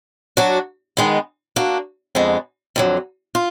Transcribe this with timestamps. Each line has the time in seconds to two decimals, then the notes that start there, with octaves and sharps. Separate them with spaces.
0.37 F#3 D4 F#4
0.97 D#3 G#3 B3
1.56 A#3 D4 F#4
2.15 F2 D3 G#3 B3
2.76 F2 D3 F#3
3.35 F4